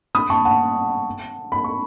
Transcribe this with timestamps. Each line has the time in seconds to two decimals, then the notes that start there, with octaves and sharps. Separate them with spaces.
0.15 B5 D#6
0.30 A5 C#6
0.45 F#5 A5
1.52 B5
1.64 C#6